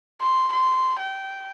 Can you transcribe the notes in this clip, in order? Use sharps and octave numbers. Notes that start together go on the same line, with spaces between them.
C6
C6
G5